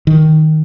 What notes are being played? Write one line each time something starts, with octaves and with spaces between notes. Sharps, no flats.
D#3